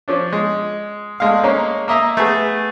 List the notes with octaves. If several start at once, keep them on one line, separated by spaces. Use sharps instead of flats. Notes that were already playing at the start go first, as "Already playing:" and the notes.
F3 C#4 D4
G#3
D2 G#3 F5
G#3 A#3 C#4
A#3 D#5 E5 A#5
A3 B3 G#4